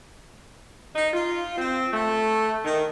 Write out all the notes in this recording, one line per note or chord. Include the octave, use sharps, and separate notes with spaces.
D#4
F4
C4
A3
D#3